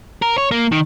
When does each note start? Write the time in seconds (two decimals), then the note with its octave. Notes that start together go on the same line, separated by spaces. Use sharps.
0.22 A#4
0.38 C#5
0.51 A#3
0.72 D#3